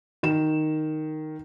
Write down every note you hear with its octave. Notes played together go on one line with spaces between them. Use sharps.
D#3 E7